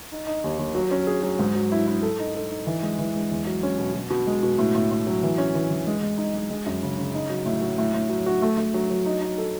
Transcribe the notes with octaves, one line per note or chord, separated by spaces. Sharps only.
D#4
D#4
D#2
D#2
F#3
C#4
G#4
F#3
G#2
F#3
E4
E4
A4
D#4
A4
D#4
E3
G#3
E3
G#3
E2
F#3
C#4
B2
B2
B2
G#3
B2
A2
A2
A2
F#3
E3
C#4
E3
E3
G#3
G#3
D#4
G#3
G#3
F#2
C#3
C#3
D#4
F#3
A2
F#3
A2
A2
F#3
F#4
A3
A3
F#3
F#3
D#4
D#4
A4